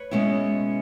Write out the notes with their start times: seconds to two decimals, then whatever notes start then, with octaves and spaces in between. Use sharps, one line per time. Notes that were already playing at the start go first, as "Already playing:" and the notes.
Already playing: B4 C#5
0.11 B2 G#3 C#4 E4